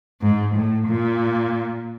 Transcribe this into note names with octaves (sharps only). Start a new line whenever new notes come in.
G#2
A2
A#2